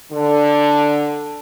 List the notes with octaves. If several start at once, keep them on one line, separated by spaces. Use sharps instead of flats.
D3